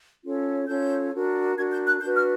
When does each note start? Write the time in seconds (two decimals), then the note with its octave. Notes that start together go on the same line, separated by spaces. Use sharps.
0.24 C#4 F4 A4 C#5
0.67 C#4 F4 A4 C#5 G6
1.12 D4 F#4 A#4
1.56 D4 F#4 A#4 G#6
1.71 G6
1.86 F#6
2.01 D4 F#4 B4 G6
2.16 F6